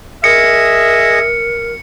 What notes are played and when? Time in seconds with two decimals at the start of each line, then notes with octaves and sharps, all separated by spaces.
0.24 G#4 A#4 D#5 E5 C#7